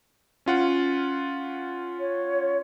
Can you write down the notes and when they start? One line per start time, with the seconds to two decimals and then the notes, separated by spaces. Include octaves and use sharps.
0.46 C#4 F4 F#5
1.99 C#5